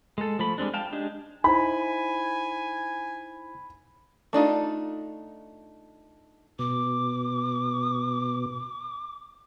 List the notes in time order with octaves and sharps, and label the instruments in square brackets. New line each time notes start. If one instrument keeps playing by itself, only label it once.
[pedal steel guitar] G#3 A4
F3 A3 B5
G3 G#3 C4 D4
F5 G5 A5
G#3 D4 D#4 G4
[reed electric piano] D#4 E4 C5 [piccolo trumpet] G#5 [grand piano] B5
[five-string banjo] A3 D4 D#4 F4
[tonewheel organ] B2 [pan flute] D6